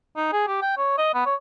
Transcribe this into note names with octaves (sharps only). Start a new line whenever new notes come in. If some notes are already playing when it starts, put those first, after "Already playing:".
D#4
G#4
G4
G5
C#5
D#5
B3
C#5